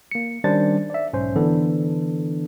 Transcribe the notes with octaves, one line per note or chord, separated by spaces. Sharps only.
A#3 C#7
D#3 G3 C#4 D4 C5 A6
D5 E5
B1 G#2 C#4 C5
D3 E3 B3 D4 A4